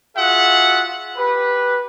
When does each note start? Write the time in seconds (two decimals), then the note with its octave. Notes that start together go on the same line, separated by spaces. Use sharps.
0.17 F4 F#4 G#4 E5 F#5
1.17 G4 B4